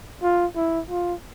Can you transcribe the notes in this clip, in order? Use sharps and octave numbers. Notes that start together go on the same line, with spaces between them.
F4
E4
F4